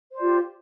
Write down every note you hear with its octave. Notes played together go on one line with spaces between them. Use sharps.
F4 G4 C5 D5